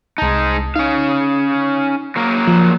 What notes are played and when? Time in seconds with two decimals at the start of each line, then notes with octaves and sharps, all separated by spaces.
0.18 C2 G#3 D#4 A5
0.76 C#4 D#4 F5
2.16 F#3 A#3 A#4
2.48 F3